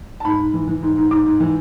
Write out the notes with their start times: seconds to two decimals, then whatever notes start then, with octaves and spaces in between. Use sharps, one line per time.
0.20 A5
0.25 G#2 B5
0.39 G#2
0.54 E3
0.68 E3
0.83 G#2
0.97 G#2
1.11 G#2 D6
1.26 G#2
1.40 E3